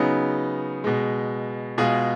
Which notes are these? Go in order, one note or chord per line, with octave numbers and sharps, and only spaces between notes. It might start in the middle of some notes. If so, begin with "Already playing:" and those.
Already playing: C#3 F#3 B3 D#4
B2 G#3
B2 G#3 F4 G#4